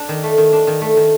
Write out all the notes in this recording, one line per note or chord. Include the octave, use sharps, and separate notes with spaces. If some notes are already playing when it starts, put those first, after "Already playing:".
Already playing: D4
D#3
A3
D#3
D4
D#3
A3
D#3